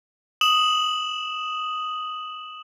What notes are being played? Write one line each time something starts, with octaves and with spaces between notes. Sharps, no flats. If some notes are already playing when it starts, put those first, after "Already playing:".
D#6 E7 F#7